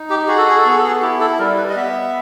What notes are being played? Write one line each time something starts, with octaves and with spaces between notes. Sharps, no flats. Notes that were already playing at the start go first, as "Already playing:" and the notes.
Already playing: D#4
G4
F#4 G#4
A4
G#4
A4
B3 G#4
A4
G#4
E4 G4
A4
G3 A#4
B4
D#5
B3 E5